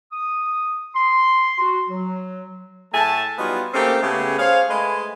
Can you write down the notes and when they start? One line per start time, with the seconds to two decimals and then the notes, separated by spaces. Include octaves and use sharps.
0.12 D#6
0.94 C6
1.59 F#4
1.89 F#3
2.93 A2 A3 E5 G#5 A5
3.38 F#3 G3 B3 D#4 F4
3.73 A3 A#3 C4 C#4 D#4 G4
4.02 C#3 A3 B3 G4 G#4
4.38 G#4 C5 C#5 F5
4.69 G#3 A3 B4 D#5 G#5